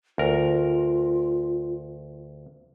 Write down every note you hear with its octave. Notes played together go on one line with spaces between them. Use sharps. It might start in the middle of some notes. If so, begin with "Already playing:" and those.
D2 F4 A#4